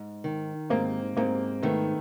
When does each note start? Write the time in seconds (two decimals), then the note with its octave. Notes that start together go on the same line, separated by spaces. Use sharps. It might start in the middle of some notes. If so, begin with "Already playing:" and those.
Already playing: G#2
0.24 D#3
0.70 G#2 A#3 C4
1.17 G#2 A#3 C4
1.63 D#3 A3 B3